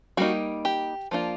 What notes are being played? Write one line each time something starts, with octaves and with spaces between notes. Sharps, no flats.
G3 A#3 D#4 F#4
G4
F3 A#3 D4 F4